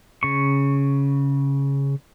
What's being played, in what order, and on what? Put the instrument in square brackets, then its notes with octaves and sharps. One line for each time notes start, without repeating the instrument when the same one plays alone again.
[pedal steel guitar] C#3 C#6